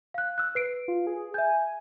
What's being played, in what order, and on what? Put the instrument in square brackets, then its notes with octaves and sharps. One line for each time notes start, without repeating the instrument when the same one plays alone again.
[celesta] F5 F#6
E6 F#6
B4 C7 D7
[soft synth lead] F4
G#4
[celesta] E5 G6 [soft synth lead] G#5